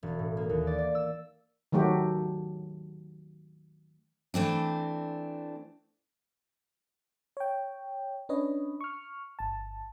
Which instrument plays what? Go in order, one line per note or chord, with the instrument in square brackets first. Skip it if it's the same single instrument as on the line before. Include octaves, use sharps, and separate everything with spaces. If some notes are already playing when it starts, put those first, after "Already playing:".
[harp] E1
A2
A#3
D#2
D5
D5
E6
[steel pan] D#3 F#3 A3 F#4 G4
[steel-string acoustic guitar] E3 A3 C4 D4
[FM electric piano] C#5 G5
C#4 D4 B4 C#5 D#5
C#6 F6
G1 A5